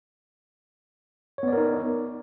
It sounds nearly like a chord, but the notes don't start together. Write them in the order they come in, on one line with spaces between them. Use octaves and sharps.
C#5 B3 D5 A#4 D#4